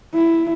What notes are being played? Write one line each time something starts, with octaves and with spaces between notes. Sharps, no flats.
E4